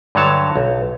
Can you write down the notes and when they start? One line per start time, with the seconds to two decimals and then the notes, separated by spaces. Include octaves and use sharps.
0.15 G2 D3 F#3 C#5 A5
0.56 B1